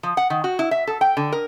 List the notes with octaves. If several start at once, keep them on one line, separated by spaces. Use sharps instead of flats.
F3
F#5
D#3
F#4
E4
E5
A4
G5
D3
A#4